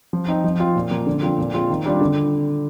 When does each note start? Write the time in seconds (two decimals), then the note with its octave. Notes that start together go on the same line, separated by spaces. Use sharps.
0.13 F3
0.28 C4 D#4
0.44 F3
0.60 C4 F4
0.76 A#2
0.91 F3 A#3
1.07 D3
1.22 F3 C4 F4
1.38 A#2
1.54 G#3 C4 F4
1.70 D#3
1.86 G3 D4 F4
2.01 D3